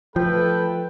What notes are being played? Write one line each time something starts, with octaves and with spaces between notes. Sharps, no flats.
F3 A3 A4 B4 G5